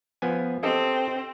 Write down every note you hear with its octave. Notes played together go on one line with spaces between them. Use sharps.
F3 B3 G#5
C4 G4 A4 D#5